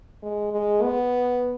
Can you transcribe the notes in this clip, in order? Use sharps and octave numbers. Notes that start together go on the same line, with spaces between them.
G#3
G#3
B3